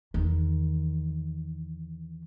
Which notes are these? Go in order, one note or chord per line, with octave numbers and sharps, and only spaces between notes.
E2 D#3